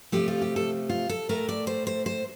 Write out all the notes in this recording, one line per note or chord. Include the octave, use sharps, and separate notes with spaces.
C3 F3 A3 G4
F4
G4
A4
F4
A4
A2 A3 A#4
D5
C5
C5
C5